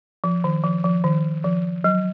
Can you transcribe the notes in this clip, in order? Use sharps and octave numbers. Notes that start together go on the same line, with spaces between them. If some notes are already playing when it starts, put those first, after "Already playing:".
F3
D#3
F3
F3
D#3
F3
F#3